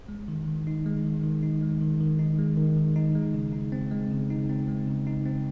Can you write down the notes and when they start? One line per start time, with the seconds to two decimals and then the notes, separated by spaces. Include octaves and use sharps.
0.08 G#3
0.28 D#3
0.48 D#3
0.67 D#4
0.86 G#3
1.05 D#3
1.23 D#3
1.43 D#4
1.62 G#3
1.81 D#3
2.00 D#3
2.19 D#4
2.38 G#3
2.57 D#3
2.77 D#3
2.96 D#4
3.15 G#3
3.34 C#3
3.53 D#4
3.72 C4
3.91 G#3
4.11 C#3
4.30 D#4
4.49 C4
4.68 G#3
4.87 C#3
5.07 D#4
5.26 C4